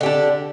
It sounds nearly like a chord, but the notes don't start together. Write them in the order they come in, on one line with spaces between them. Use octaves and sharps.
D3 G4 D4